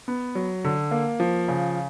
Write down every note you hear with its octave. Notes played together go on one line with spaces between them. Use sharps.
B3
F#3
D3
A#3
F3
C#3